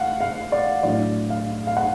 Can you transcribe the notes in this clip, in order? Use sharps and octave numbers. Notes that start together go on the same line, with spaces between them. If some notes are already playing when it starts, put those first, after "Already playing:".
Already playing: A3 F5 F#5
F5
D5
A2 F#3 A3 D4 D5
F5
F5
F#5